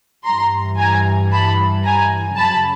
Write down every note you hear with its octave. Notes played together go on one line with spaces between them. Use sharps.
G2 E3 G3 A#5 C6
G#5 A#5
A5 B5
G#5 A#5
F#2 C#3 F#3 A5 B5